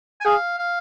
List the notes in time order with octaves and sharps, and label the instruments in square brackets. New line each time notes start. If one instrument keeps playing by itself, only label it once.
[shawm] G#5
[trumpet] G#4 [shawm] F5
[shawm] F5